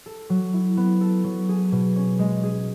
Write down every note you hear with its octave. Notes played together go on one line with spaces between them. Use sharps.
A4
F#3
E4
B3
A4
F#3
G#4
B2
C#4
G#3
G#4